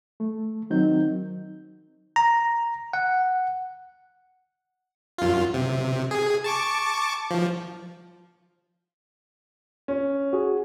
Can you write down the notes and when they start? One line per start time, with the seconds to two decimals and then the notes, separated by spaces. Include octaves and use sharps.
0.20 A3
0.70 D#3 F#3 C4 G6
2.16 A#5
2.93 F#5
5.18 F#2 F4
5.54 C3
6.11 G#4
6.44 A5 C#6 D6
7.31 F3
9.88 C#4
10.33 F#4 G#4